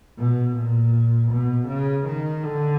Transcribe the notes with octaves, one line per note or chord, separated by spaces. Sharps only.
B2
A#2
B2
C#3
D#3
D3